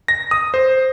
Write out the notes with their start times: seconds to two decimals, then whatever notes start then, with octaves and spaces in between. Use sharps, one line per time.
0.08 A#6
0.31 D#6
0.54 C5